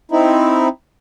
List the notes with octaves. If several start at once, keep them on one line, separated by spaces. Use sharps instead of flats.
C4 D#4 E4